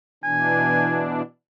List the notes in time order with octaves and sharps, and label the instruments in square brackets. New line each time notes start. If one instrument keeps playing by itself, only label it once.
[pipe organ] B2 E3 D4 [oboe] G#5